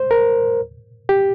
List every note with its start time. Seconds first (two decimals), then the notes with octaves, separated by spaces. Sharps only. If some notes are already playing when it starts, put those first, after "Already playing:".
Already playing: C5
0.11 A#4
1.09 G4